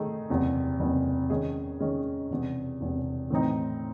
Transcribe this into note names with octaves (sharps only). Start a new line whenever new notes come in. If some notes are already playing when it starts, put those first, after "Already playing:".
Already playing: D#3 A3 D#4 G#4
F#1 E2 C3
F#1 E2 C3
D#3 G#3 C#4 G#4 D#5
D#3 G#3 C#4 G#4 D#5
E1 E2 C3
E1 E2 C3
A2 E3 C4 D#4